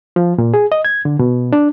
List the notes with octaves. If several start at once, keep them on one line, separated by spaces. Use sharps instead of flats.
F3
A#2
G#4
D#5
G#6
D3
B2
D4